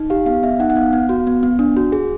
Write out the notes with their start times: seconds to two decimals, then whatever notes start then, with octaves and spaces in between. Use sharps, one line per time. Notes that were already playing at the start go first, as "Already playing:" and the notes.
Already playing: D#4
0.10 G4 F5
0.26 B3 F5
0.43 B3 E5
0.60 D#4 F#5
0.70 F#5
0.76 B3 F5
0.93 B3
1.09 F#4
1.27 B3
1.43 B3
1.59 D4
1.77 F#4
1.92 G#4